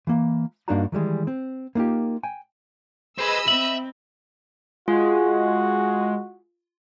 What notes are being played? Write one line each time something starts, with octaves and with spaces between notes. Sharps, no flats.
E3 A#3
G2 A#3 D4 D#4 F#4 A#5
D#3 E3 G3 G#3
C4
A#3 B3 D#4 F4 G4
G5 G#5
G#4 B4 C5 D#5 B5 E6
C4 E5 F#7
G#3 F4 F#4